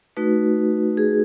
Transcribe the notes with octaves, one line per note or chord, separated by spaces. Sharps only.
A3 D#4 F#4 B4
G#4